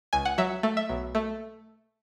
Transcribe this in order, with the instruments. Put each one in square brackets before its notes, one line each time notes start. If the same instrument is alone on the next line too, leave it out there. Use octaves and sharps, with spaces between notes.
[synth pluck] C#2 G#5
F#5
F#3 E5
A3
E5
B1
A3